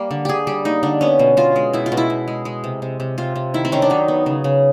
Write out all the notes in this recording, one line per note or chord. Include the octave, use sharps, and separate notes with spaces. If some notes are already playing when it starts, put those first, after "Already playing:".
Already playing: G3 A#3
D3
D3 G4 G#4
G3 G4
A#3 D#4
D3 D4
B3 C#4
B2
B2 F4
G#3
B2 E4
F4
B2
E4
B2
G#3
G#3
C3
C3
C3
C3 F4
C3
D#3 E4
C4
D#3 C#4
D4
F#3 D#4
B3
C#3
C#3